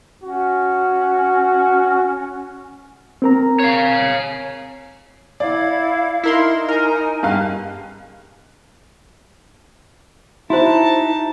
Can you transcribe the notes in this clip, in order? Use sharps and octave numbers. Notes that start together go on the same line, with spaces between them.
C#4 F#4
C4 A#4 A#5
C#5 F5
E4 D5 F5 G#6
D#4 E4 A#4 C6
A#4 G#5
G2 G#4 F5 G5
D#4 E4 F#4 C5 A5